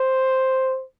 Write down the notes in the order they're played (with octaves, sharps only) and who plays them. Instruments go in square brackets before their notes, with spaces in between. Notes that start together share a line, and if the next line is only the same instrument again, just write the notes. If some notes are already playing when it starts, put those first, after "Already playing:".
Already playing: [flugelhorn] C5